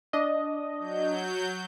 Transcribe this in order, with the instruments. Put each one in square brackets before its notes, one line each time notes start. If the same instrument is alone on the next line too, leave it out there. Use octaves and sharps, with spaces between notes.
[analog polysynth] D4 D#5
[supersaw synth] F#3 G6